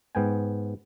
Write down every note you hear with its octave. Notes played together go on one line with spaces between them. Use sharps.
G#2 B3 G5 G#5